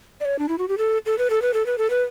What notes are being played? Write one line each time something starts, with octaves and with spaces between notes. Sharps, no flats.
D5
C#5
D4
E4
F#4
G4
A4
A4
B4
A4
B4
A4
B4
A4
B4